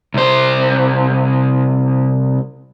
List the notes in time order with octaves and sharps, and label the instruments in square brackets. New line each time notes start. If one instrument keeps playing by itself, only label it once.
[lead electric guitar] C2 C5